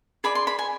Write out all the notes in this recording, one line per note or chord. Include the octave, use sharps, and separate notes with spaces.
G#4 D5 B5
C6
B5
G#5